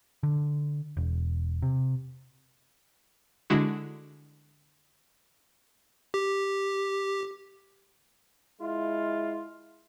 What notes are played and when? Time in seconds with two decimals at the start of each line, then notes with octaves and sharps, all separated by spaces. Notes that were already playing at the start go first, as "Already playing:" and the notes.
0.23 D3
0.97 E1
1.62 C3
3.50 D3 G#3 E4 F#4
6.14 G4
8.61 G#3 E4 F4